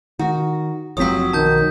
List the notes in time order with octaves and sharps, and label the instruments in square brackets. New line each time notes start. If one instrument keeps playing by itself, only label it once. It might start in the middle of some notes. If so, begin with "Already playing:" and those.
[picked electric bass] D#3 [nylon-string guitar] F#4
[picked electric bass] F#1 F3 C4 [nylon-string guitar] F#3 G4 C#5 [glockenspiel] D#6 B6
[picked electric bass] B1 [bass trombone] D#3 [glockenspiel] A5 G6